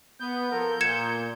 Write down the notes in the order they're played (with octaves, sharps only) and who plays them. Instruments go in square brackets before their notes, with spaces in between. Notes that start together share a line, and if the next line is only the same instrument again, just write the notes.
[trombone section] B3 [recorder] G6
[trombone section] F3 A4 A#4
[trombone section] A#2 [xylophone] G#6 C#7 E7